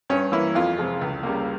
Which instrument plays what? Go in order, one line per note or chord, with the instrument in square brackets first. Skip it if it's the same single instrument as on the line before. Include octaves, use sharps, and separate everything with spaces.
[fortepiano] G2 C#4
E3 A#3 E4
F2 F4
C3 F3 G#3
C#2
C#3 G3 A#3